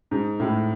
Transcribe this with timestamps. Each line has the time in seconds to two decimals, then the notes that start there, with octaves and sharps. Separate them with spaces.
0.11 G#2
0.40 A2